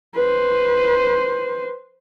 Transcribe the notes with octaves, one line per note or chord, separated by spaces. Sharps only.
B4 C5